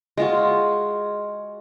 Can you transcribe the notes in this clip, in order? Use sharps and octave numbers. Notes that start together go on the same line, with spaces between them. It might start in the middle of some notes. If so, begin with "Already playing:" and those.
G#3 F4 F#4